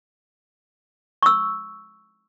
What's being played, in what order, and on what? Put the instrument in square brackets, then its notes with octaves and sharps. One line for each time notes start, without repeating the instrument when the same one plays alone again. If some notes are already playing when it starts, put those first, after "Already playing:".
[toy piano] C#6 E6